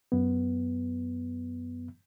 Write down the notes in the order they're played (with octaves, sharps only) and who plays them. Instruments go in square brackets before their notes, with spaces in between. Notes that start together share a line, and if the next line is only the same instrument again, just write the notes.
[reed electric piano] F#2 B3